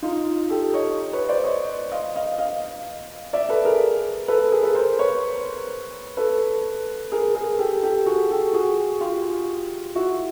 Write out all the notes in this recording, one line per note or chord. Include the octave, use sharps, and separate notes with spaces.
D#4 F4
G4 A4
C#5 D#5
B4 C#5
C5 D5
C#5 D#5
D#5 F5
D#5 F5
D#5 F5
D5 E5
A4 B4
G#4 A#4
A4 B4
G#4 A#4
A4 B4
A#4 C5
B4 C#5
A4 B4
G#4 A#4
G#4 A#4
G4 A4
G4 A4
F#4 G#4
G4 A4
F#4 G#4
F4 G4
E4 F#4